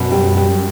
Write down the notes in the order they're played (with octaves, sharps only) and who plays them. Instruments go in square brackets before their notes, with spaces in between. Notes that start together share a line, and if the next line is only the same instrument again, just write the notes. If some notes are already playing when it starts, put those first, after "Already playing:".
Already playing: [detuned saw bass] F#2 [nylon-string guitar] B2
[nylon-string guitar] G3
G3